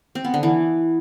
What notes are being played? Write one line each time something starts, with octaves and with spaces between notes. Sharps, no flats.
C4
B3
D3
E3